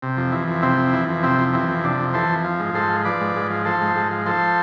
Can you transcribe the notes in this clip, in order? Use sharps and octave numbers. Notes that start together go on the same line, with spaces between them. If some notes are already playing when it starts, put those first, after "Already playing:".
C3
F2
E3
F2
C3 C4 E4
F2
E3
F2
C3 C4 E4
F2
E3 C4
F2
C3 D4
F2
E3 A4 C5
F2
F3
G#2
G#2 A4 C5
F3
F3 B4 D5
G#2
G#2
F3
F3 A4 C5
G#2
G#2
F3
F3 A4 C5